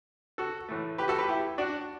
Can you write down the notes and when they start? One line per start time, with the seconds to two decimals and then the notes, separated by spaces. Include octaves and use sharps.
0.38 F#4 A4
0.69 A2 E3 A3
0.98 G4 B4
1.08 F#4 A4
1.18 G4 B4
1.28 E4 G4
1.58 D4 F#4